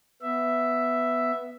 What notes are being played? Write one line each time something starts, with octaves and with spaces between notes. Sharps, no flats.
B3 E5